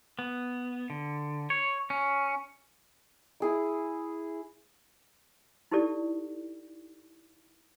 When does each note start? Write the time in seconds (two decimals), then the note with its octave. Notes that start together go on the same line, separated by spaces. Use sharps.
0.19 B3
0.90 D3
1.50 C#5
1.90 C#4
3.40 E4 G#4 D6
5.72 D#4 E4 G4 A4 D5